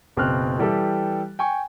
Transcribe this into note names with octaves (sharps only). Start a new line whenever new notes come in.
F#1 B2 C4 F6 F#6
E3 G3 G4 A4
G5 G#5 C#6